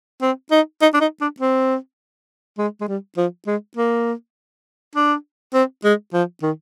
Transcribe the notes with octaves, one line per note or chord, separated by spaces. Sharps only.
C4
D#4
D#4
D4
D#4
D4
C4
G#3
G#3
G3
F3
G#3
A#3
D4
C4
G#3
F3
D#3